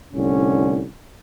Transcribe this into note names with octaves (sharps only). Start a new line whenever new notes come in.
C2 A2 D3 C#4